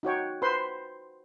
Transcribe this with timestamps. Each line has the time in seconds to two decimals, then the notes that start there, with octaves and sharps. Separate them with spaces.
0.03 D#4 F#4 C#5 G5
0.42 B4 C5 C6